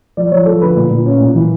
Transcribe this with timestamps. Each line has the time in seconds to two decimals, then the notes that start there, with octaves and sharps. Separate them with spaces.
0.17 F3 D5
0.32 F3 C#5
0.46 F3 A4
0.62 D3 B4
0.76 A#2
0.90 A#2
1.06 C#4
1.20 A#2
1.35 E3